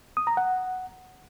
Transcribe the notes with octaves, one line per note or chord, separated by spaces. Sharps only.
D#6
A#5
F#5